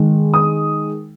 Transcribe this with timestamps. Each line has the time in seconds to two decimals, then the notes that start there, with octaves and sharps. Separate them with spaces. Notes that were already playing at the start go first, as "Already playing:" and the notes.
Already playing: D#3 G#3
0.34 D#6